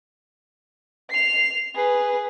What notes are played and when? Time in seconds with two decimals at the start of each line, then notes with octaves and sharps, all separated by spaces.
1.10 C7 F7
1.75 G#4 B4